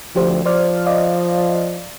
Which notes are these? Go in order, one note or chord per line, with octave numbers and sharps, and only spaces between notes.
D2 F3 G4 C5
F3 C5 D5 F6
D5 D#5 F5